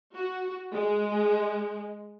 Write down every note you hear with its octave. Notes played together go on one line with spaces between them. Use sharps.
F#4
G#3